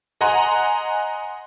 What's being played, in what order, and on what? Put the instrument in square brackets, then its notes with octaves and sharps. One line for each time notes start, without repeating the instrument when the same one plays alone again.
[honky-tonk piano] D#5 F#5 G#5 A#5 C6